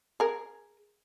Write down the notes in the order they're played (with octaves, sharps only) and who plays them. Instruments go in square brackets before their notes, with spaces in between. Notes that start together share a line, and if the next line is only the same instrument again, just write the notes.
[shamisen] G#4 A#4